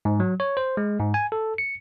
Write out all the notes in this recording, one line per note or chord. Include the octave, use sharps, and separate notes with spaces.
G#2
F#3
C#5
C5
G#3
G#2
G#5
A4
C#7